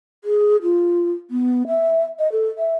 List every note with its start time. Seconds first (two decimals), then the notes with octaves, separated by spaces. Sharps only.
0.24 G#4
0.62 F4
1.31 B3
1.68 E5
2.19 D#5
2.32 A4
2.58 E5